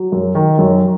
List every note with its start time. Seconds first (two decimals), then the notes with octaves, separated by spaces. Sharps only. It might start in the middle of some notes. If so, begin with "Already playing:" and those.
Already playing: F#3
0.12 F#2
0.35 D#3
0.58 F#2